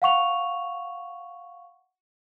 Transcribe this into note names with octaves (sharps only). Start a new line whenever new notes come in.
F5 F#5 C#6 F7